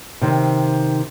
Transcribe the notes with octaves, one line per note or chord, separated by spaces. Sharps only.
C3 D#3 C4